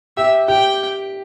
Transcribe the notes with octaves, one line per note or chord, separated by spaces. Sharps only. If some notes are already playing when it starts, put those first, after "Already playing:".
G4 E5
G4 G5